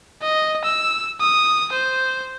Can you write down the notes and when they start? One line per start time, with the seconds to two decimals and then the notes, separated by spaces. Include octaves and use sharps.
0.22 D#5
0.64 E6
1.20 D#6
1.72 C5